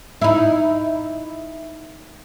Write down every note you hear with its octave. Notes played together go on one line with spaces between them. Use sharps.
D#4 E4